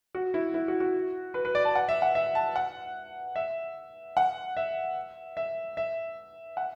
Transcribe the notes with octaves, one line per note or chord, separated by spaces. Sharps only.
F#4
E4
E4
F#4
F#4
B4
B4
D5
A5
F#5
E5
F#5
E5
A5
F#5
E5
F#5
E5
E5
E5
F#5